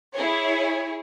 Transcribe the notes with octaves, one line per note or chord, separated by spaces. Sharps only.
E4 G#4 C#5